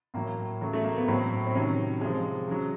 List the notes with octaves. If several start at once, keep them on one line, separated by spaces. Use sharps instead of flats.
A2 F#3 A#3
C#3 F#3 A3
A3
A#3
B3
A2 F#3 C4
C4
C3 D#3 F#3 C#4
C3 F3 G#3
C#3 F#3